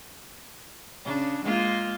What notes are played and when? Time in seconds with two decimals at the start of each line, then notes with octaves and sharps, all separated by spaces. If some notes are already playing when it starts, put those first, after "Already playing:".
1.04 C#3 D4
1.45 G#3 A#3 F4